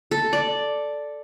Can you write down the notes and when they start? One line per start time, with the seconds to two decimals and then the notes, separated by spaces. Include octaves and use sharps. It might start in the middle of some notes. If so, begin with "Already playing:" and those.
0.11 A4
0.33 D5